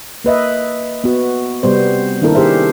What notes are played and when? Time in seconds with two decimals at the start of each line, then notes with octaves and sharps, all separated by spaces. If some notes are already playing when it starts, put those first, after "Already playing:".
0.24 A#3 B4 D#5 E5
1.04 B3 F#4
1.63 C3 G3 B3 C5
2.21 D#3 A#3 D4 E4 A4 A#4
2.35 G4 G#4 C5 E5